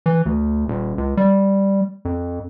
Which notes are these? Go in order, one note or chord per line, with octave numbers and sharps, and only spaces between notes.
E3
D2
D#1
C#2
G3
F2